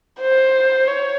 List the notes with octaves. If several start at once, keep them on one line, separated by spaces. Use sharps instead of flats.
C5
C#5